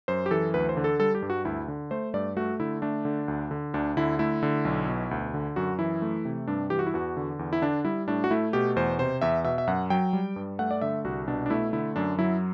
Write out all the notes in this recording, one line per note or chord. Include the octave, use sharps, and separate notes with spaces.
F#2 C5
G4
E3 A4
D2 B4
C5
D3
A4
G3 A4
G4
G2
F#4
D2 E4
D3
A3 C5
G2 D5
A3 F#4
D3 E4
A3 D4
D3
D2
D3
D2 D4
D3 E4
A3 E4
D3
B1
B2
D2
D3
F#2 F#4
E3 E4
A3
C3
G2 D4
E3 G4
F#4
E4
E2 F#4
D3
E2
E4
D3 D4
G3 E4
A2 D4
F#4
A3 E4
B2 G4
E2 C5
C3 C5
E2 E5
B2 E5
E5
F#2 F#5
F#3 G5
G3
G2
A3 F#5
D5
D3 E5
C2 F#4
B2 D4
D4
A3 E4
D3 E4
F#2 D4
F#3 E4